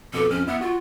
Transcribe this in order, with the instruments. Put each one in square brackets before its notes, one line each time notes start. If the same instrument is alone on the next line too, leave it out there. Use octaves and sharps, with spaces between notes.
[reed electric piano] F2 B2 D6 [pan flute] A4
[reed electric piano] F2 F6 [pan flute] C#4
[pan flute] B3 [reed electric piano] E4 E5 F#5
[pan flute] F4 [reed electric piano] F#4